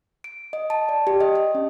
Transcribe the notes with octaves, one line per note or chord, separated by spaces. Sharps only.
D7
D#5
A5
D5
G4
D#5
D#5
C#4